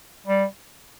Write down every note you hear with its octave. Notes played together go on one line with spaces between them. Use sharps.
G3